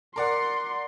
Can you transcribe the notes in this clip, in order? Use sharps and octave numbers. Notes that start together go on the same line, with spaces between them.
A#4 D5 F#5 C6